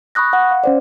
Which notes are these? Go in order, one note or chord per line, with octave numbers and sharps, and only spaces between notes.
B5 C#6 D#6 F#6 A#6
F#5
F5
C#4 C5 D5